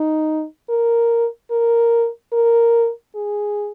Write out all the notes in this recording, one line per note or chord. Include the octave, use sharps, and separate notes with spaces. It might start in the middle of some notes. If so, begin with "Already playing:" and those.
Already playing: D#4
A#4
A#4
A#4
G#4